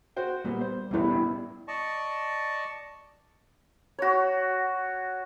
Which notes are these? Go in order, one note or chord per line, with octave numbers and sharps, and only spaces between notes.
F#4 C5 G5
A#2 G3 B3
C5
A1 E2 B2 G3 E4
G2 B2
D5 D#5 A5 C#6
F#4 C#5